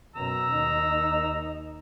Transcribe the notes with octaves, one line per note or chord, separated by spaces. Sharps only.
F#2 B2 A#5 E6
D#2 D#4